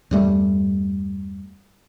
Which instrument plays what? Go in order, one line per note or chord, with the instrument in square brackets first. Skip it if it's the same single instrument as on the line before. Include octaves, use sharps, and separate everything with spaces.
[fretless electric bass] E2 G2 G3 A3